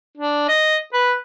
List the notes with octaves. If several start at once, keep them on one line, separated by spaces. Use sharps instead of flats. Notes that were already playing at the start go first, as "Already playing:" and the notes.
D4
D#5
B4